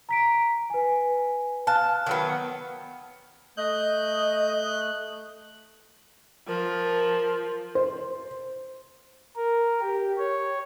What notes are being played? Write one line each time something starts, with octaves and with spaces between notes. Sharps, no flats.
A#5 B6 D7
B4 G#5
F5 A5 F6 F#6
D#3 F#3 B3
A3 D#5 F#6 G6
F3 A#4
C5
A#4
G4
C#5